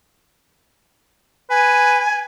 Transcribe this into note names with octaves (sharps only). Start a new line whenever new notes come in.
B4 G#5